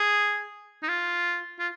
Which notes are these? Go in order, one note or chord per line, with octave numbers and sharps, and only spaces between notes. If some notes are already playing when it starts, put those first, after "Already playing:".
Already playing: G#4
D#4
F4
F4